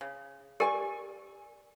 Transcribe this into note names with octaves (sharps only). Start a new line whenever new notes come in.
C#3
G4 A#4 D5 G#5 C#6